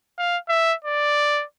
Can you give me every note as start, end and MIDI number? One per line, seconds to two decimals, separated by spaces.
0.19 0.38 77
0.49 0.74 76
0.85 1.44 74